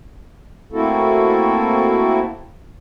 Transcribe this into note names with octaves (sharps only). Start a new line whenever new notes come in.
A3 A#3 C4 E4 F#4 A4